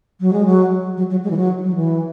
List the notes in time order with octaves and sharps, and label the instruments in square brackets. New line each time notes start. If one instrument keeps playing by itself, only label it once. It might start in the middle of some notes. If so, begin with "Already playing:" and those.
[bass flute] F#3
G#3
F#3
F#3
F#3
G#3
E3
F#3
F#3
E3